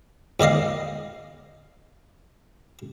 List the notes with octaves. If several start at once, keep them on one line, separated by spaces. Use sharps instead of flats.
G#2 D#3 D5 D#5 F5